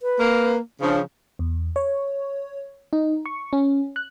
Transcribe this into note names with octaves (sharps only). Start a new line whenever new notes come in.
B4
A#3
C#3 F3 D4
E2
C#5
D#4
C#6
C#4
F#6